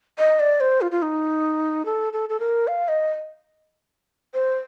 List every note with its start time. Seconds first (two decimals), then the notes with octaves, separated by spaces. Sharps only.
0.18 D#5
0.40 D5
0.60 C5
0.81 F4
0.91 F4
1.02 D#4
1.85 A4
2.13 A4
2.29 A4
2.40 A#4
2.67 F5
2.88 D#5
4.34 C5